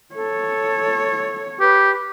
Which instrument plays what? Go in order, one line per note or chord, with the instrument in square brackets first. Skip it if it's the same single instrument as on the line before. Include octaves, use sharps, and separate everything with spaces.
[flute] A4 [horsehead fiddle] C#5
[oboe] G4 [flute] B4